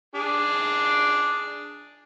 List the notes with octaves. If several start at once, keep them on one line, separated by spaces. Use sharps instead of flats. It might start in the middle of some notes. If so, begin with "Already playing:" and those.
D4 G#4